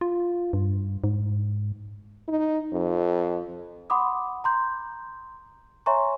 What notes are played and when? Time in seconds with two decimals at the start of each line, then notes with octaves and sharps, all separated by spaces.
0.01 F4
0.53 G2
1.04 G#2
2.28 D#4
2.72 F2
3.90 F#5 B5 C6 D6 D#6
4.44 A#5 C6 G6
5.86 C#5 E5 G#5 A#5 C6 C#6